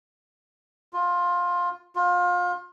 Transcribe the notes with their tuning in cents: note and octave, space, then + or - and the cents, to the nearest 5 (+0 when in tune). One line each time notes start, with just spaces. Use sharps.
F4 +15
F4 +30